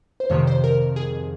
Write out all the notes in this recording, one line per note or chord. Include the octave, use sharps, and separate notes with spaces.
C5
F2 C3 D#3 C#5
C5
A#4
G#4